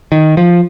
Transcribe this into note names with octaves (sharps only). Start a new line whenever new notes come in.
D#3
F3